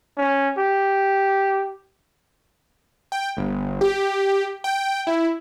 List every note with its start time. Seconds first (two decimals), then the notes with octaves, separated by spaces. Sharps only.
0.17 C#4
0.58 G4
3.12 G5
3.37 G1
3.81 G4
4.64 G5
5.07 E4